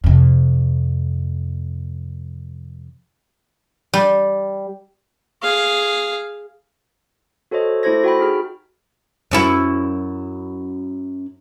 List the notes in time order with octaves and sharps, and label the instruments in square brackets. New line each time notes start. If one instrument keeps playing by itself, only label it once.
[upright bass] F2 C3
[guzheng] G3
[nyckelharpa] G#4 F5
[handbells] F#4 A4 C5 C#5 D#5
A3 E4 A4 C5 G#6 A#6
F#4 G5 B5
D#4 F#4 G#4 F6
[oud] F#2 C#4 E4